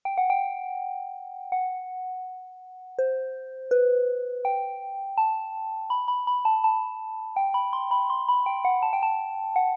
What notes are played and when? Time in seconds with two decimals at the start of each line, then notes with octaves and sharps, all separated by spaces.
0.05 G5
0.18 F#5
0.30 G5
1.52 F#5
2.99 C5
3.71 B4
4.45 G5
5.18 A5
5.90 B5
6.08 B5
6.27 B5
6.45 A5
6.64 A5
7.36 G5
7.54 B5
7.73 C6
7.91 B5
8.10 C6
8.28 B5
8.46 G5
8.65 F#5
8.82 A5
8.93 G5
9.03 A5
9.56 F#5